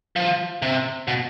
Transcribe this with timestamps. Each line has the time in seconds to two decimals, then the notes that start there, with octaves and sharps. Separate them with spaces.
0.16 F3
0.62 C3
1.08 B2